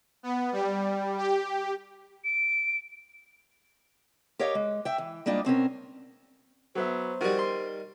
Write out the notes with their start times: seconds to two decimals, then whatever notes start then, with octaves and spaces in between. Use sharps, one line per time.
0.23 B3
0.52 G3
1.17 G4
2.25 D7
4.39 G4 A#4 C#5 D#5 F5
4.55 G#3
4.85 E5 G5
4.98 E3
5.26 G3 G#3 A#3 D4 F4
5.45 B2 C4 C#4 A#4
6.75 F#3 B3 C5 E5
7.21 D#3 G3 F#4
7.39 C6